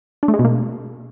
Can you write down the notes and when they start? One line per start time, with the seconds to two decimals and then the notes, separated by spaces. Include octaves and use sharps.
0.23 D4
0.28 A3
0.34 G#3
0.39 B2
0.45 A#3